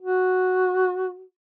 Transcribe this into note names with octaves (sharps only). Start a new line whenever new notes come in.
F#4